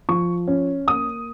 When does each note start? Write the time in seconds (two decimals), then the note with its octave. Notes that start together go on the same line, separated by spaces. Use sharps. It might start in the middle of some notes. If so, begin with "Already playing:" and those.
0.09 F3 C#6
0.48 C#4
0.87 A#3 D#6